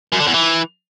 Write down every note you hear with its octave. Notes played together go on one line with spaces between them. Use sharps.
F#2
D3
E2
E3